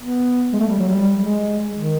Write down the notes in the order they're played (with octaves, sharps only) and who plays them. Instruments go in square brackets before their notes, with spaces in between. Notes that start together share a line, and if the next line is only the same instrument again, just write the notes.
[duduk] B3
G#3
A3
G3
F#3
G3
G#3
D#3